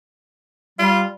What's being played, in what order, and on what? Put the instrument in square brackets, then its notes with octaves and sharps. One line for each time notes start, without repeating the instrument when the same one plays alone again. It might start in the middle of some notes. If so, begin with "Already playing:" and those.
[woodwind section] G3 [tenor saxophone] F4